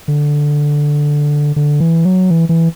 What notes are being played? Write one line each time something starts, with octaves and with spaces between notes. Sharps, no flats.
D3
D3
E3
F#3
E3
E3